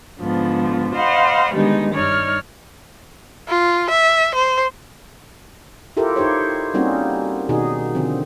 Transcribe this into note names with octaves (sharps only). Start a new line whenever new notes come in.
G#2 D3 F3 B3
C5 D#5 F5 F#5 B5 F6
D3 D#3 G3 G#3 B3 D#4
G2 D#4 C#5 D5 F6
F4
E5
C5
E4 F4 G4 A4 A#4
D#4 E4 G4 C5 C#5
G3 A#3 C4 C#4 D#4 F#4
B2 D#3 D#4 F#4 G#4
D3 F3 C4